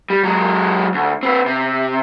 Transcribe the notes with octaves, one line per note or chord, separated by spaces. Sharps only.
G3
F#3 G#3
D2
C4 B4
C3